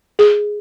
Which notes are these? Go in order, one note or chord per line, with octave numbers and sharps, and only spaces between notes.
G#4